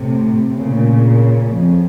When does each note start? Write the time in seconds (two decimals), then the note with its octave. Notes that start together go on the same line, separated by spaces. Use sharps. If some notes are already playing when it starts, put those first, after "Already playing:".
Already playing: A2 C3
0.55 A#2 C#3
1.52 F2